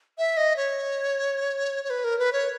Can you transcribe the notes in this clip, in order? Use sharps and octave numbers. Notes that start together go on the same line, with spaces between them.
E5
D#5
C#5
C#5
B4
A#4
B4
C#5